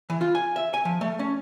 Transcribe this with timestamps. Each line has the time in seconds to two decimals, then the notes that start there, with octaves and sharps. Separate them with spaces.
0.10 E3
0.21 F4
0.35 G#5
0.56 E5
0.74 G#5
0.85 F3
1.01 A3
1.19 C#4